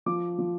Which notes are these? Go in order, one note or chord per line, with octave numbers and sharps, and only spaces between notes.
F3 D6
F3